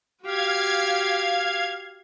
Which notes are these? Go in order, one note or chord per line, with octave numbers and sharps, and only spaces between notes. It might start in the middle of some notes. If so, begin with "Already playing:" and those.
F#4 G4 F5 G#6